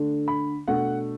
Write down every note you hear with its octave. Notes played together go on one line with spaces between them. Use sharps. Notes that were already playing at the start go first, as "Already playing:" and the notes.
Already playing: D3 A3 D4
B5
B2 A3 D4 F#5